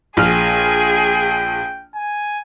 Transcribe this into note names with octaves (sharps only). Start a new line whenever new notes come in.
A#1 G#4 G5 F6
G#5